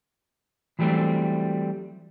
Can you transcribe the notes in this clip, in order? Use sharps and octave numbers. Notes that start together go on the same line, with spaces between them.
E3 F#3 G3 A3 C4